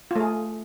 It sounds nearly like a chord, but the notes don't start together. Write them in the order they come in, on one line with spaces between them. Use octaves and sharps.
F4 A3 G#4